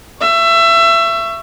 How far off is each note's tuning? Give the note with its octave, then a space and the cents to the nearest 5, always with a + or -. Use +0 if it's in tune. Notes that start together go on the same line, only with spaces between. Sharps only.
E5 +25 C#6 +5